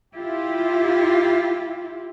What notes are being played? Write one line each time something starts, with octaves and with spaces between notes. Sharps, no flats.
E4 F4 G4